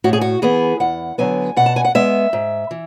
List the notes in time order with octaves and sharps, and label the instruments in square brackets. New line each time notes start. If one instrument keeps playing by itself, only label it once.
[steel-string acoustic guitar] A2 F#4
G#4
F#4
E3 B3 G#4
E2 F#5
D3 F#3 B3 G#5
B2 F#5
A5
G#5
F#5
G#3 B3 E5
G#2
E3